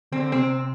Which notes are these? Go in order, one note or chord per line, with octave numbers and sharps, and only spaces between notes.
D3 C4
C3 C4